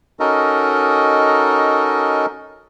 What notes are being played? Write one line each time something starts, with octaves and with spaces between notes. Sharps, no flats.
C#4 D#4 F#4 A4 A#4 D#5